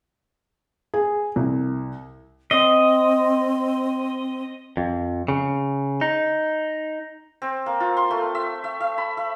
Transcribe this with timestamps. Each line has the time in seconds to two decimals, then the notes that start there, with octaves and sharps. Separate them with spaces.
0.94 G#4
1.36 C2
2.51 C4 D#5
4.77 F2
5.28 C#3
6.01 D#4
7.42 C4
7.66 A#3
7.80 F4
7.97 C6
8.11 A3
8.35 E5
8.64 E5
8.80 E5
8.98 B5
9.17 E5